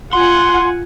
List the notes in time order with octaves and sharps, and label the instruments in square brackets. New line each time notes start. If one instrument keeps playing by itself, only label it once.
[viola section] F4 F#5 G#5 [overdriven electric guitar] C6